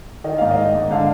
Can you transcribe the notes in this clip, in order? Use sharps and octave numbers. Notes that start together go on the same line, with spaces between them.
D#3 D#5
G#2 F5
D#5
D#3
G#2
D3 F5